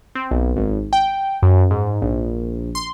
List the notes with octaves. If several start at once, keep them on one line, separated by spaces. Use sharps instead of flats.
C4
B1
G#1
G5
F#2
G#2
A#1
C6